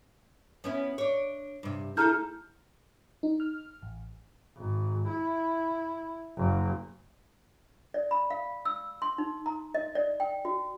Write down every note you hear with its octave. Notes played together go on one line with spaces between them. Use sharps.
B3 C#4 E4
D4 C#5
G2 C3
A3 E4 G#4 A4 A#5 F6 G6
D#4
F6
A1
G#1
E4
F#1
D5
B5
F5
E6
C6
D#4
A#5
D#5
D5
G5
F#4